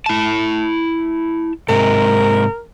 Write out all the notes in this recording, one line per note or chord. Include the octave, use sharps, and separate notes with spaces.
E4 A5
G#2 C3 A#4